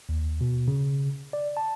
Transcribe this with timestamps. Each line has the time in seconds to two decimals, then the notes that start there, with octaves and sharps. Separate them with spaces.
0.09 D#2
0.41 B2
0.68 C#3
1.33 D5
1.57 A5